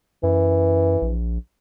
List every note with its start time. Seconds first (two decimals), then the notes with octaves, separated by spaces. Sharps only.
0.23 F#2 E3
1.02 A#1